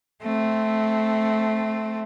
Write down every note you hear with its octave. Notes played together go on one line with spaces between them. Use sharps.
A3 C4